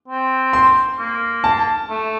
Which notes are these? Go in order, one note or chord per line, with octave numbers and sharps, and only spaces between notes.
C4
C6
A#3
A5
A3